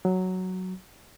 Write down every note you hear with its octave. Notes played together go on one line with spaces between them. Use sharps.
F#3